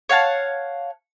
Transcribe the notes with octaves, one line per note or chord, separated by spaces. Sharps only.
C#5 F5 F#5 A5